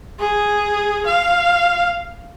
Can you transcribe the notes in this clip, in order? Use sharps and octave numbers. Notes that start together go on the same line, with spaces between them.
G#4
F5